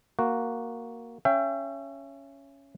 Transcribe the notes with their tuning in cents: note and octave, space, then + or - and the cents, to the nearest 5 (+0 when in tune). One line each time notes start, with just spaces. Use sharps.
A#3 +0 F#4 +0
C#4 +0 E5 +35 G5 +0